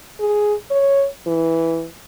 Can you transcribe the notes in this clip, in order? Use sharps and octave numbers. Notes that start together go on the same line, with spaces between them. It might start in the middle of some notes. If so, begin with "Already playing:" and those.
G#4
C#5
E3